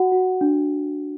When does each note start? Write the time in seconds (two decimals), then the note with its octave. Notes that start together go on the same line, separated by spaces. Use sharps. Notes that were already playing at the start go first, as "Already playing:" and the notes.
Already playing: F#4 F#5
0.12 F#4
0.41 D4